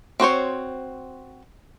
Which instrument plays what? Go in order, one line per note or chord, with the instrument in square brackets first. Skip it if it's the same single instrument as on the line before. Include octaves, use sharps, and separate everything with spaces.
[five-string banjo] C4 F#4 C5 C#5